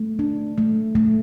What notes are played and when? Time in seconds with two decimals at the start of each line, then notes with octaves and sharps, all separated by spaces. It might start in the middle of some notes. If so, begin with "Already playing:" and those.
Already playing: A3
0.19 D4
0.58 A3
0.95 A3